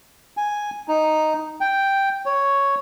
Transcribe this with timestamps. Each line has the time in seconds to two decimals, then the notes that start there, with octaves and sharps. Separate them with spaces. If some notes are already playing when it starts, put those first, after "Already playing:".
0.37 G#5
0.88 D#4
1.61 G5
2.26 C#5